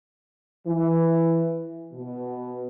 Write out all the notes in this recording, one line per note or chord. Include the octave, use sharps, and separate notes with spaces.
E3
B2